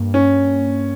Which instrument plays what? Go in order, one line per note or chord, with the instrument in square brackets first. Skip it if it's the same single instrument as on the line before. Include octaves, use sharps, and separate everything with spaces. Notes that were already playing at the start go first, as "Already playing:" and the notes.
Already playing: [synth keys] G2 A#3
[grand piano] C#4